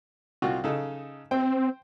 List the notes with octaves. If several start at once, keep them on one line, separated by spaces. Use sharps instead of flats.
C2 F4 F#4
C#3 D#4 A4
C4 C5 G5